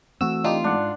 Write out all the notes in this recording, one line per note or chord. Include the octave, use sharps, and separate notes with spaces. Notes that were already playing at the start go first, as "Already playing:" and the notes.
E3 A3 C4 F#4 E6
D4 D#4 F4 G4
G#2 D4 F#5